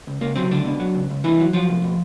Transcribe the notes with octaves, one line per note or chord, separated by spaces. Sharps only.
C#2
C#2 A#3
C3 F#3 C4
C#2 D3 D4
B2
F#3
C#2
C#2
C2 E3 E4
F#3
F3 F#3 F4
C2
B2